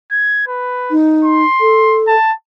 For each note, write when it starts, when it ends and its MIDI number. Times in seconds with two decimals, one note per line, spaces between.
0.11 0.43 92
0.47 0.94 71
0.91 1.44 63
1.24 2.01 84
1.61 2.15 69
2.07 2.33 81